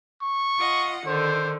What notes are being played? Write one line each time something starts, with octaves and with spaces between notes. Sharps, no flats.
C#6
F4 D#5 F#5
D3 D#3 C5